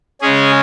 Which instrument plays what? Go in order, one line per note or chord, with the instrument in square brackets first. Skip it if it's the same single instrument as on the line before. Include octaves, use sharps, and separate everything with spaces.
[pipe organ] C#3 G#3 C#4 G#4